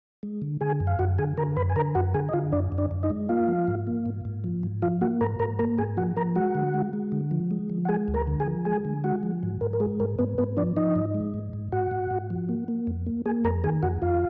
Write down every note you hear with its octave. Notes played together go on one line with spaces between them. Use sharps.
G#3
D3
D3 G#4 G#5
F#2
F5
F#2 F#4 F#5
D3 G#4 G#5
D3 A#4 A#5
F#2 B4 B5
G#5
D3 A#4 A#5
F#2 F#4 F#5
D3 G#4 G#5
D#5
D3 F4 F5
F#2 D4 D5
F#2
D4 D5
F#2
D#4 D#5
G#3
A#3 F4 F5
F3
G#2
A#3
G#2
G#2
F3
G#2
F3 F4 F5
A#3 F#4 F#5
G#2 A#4 A#5
G#2 A#4 A#5
A#3 A#4 A#5
G#2 G#4 G#5
F3 F#4 F#5
F3 A#4 A#5
G#3 F#4 F#5
D3
G#3
G#3
D3
F3
G#3
F3
F#5
G#3 G#4 G#5
D2
A#4 A#5
D3
G#4 G#5
F3
G#3 G#4 G#5
D3
G#3 F#4 F#5
F3
G#2
G#2 A#4
A#4
G#3 G#4
G#2 A#4
G#2 B3 B4
G#2 B3 B4
F3 D4 D5
F3 D#4 D#5
G#2
G#3
G#2
G#2
G#2 F#4 F#5
G#2
G#2
F3
A#3
A#3
F2
A#3
A#3 G#4 G#5
F2 A#4 A#5
D#3 G#4 G#5
F2 F#4 F#5
F2 F4 F5